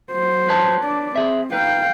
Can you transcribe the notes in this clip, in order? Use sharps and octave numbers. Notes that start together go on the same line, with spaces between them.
F#3 C5
B4 C#5 A5
D4 D5
C4 G#4 E5
D#4 B4 F5 G5